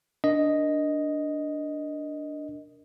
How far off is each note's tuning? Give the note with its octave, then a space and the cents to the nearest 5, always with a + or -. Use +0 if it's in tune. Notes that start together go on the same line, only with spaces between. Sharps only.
D4 -5 A#4 +0 D#5 +0